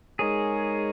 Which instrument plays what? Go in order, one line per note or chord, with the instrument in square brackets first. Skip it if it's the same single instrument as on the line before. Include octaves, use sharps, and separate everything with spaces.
[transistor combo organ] G#3 D#4 A#4 C#5 [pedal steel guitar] G#4